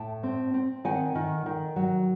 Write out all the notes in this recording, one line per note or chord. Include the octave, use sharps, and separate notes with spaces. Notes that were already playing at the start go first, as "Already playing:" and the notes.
Already playing: A2 G5 A5
C4
C4
D#3 F#5 G#5
D#3
D#3
F#3